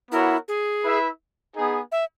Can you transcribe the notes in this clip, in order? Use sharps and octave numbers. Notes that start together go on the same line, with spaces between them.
B3 E4 F#4 A#4 C#5 F#5
G#4
E4 B4 E5
B3 D#4 G#4
E5